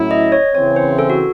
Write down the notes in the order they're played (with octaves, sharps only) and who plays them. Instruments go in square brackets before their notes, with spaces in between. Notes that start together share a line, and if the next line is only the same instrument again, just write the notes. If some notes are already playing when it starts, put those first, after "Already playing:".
Already playing: [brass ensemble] A2 F#3 C#4 E4
[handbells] D#5
C#5
[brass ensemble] C#3 E3 C4 [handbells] C#5
[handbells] C5
A4
F#4